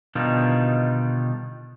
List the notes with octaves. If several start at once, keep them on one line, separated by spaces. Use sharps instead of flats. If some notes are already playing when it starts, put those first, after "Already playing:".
B2 D3 D#3 G3 D#4 F4